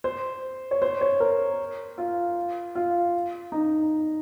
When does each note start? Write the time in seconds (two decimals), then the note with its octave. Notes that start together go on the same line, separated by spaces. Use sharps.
0.04 C5
0.71 C#5
0.82 C5
1.01 C#5
1.20 A#4
1.98 F4
2.75 F4
3.52 D#4